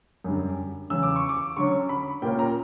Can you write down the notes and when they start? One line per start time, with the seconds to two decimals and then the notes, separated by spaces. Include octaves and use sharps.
0.24 F#2 D3 G3
0.90 E2 C#3 F#3 E6
1.03 D6
1.16 C#6
1.29 D6
1.57 D3 F#3 C#4 C#6
1.89 B5
2.22 A#2 A#3 C#4 G5
2.39 A#5